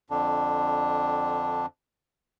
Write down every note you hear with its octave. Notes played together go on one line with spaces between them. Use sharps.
F2 D3 D4